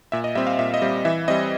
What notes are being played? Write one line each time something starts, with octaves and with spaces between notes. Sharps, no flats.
A#2 E5
D#5
G3 C4 E5
F5
A#2 E5
D#5
G3 C4
E3 E5
G3 C4 D#5